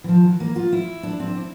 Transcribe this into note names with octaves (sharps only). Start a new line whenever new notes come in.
E3
F3
E3
A#3
F4
E4
D4
C4
D4
E4